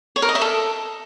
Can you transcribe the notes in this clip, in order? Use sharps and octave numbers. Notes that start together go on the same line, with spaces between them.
C#5
A#4
D#5
E5
A4